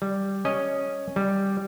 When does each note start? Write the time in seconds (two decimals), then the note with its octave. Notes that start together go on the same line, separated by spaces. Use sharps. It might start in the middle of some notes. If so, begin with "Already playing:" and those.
0.02 G3
0.45 C#4 D#5
1.16 G3